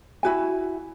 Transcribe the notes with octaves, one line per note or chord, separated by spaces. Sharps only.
E4 F#4 G#5